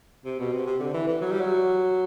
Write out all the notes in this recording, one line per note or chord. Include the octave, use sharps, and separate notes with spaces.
C3
B2
C3
C3
D3
E3
E3
F#3
G3
F#3